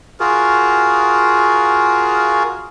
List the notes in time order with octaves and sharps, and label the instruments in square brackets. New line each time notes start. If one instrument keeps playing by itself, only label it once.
[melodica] F4 F#4 G#4 A#4